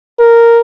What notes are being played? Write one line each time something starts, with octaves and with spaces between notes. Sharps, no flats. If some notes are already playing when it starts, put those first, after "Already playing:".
A#4